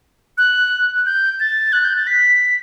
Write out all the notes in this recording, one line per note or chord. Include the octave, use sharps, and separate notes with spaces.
F#6
G6
A6
F#6
G6
A6
B6